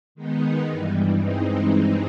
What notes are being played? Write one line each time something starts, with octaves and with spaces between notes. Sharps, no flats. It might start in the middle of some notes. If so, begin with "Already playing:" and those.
D#3 G#3 B3 D#4
G2 E3 G3
G2 E3 G#3 C4 D#4